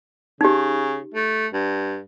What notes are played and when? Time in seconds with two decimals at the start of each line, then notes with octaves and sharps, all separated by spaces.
0.41 C#3 D#4 G4
1.14 A3
1.53 G2